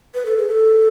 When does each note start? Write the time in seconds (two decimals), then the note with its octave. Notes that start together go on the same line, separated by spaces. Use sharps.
0.14 B4
0.26 A4
0.37 G#4
0.48 A4